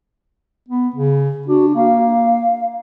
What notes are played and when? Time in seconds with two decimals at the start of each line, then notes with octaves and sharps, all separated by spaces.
0.68 B3
0.96 C#3
1.48 D4 F#4
1.75 A#3 F5